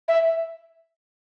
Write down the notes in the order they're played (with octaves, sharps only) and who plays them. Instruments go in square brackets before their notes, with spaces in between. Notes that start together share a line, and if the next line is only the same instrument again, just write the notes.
[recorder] E5